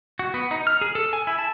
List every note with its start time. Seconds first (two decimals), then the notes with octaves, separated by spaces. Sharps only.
0.19 F#4
0.34 B3
0.51 D#4
0.67 F6
0.81 G#4
0.95 A4
1.13 G#5
1.27 E4
1.39 A5